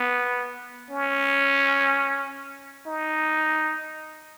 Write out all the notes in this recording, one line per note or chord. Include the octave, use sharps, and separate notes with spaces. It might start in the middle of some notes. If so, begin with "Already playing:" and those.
Already playing: B3
C#4
D#4